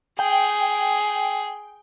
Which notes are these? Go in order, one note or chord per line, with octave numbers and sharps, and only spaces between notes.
G#4 G5